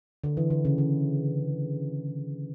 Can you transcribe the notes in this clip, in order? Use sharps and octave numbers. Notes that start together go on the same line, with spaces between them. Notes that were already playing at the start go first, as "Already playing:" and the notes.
D3
E3
D3
C#3
D3